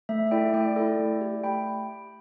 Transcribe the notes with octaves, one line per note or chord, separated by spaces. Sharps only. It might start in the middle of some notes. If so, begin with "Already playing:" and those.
A3 E5
E5
E4 A4 D5 G5
A3 D5 G5
E4 A4
A3
G4
A3 G5 B5